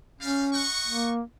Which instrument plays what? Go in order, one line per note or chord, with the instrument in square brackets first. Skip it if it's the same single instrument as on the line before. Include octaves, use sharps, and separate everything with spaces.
[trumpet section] G3 F5 [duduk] C#4
[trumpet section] D#5 F#5 C#6
[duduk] A#3